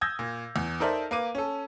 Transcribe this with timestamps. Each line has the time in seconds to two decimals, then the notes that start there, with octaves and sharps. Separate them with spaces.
0.01 D#6 E6 G6 G#6 A#6
0.19 A#2
0.56 E2
0.80 D#4 A4 A#4 C5 D5 E5
1.11 A#3 B4 D6 D#7
1.35 C#4 A4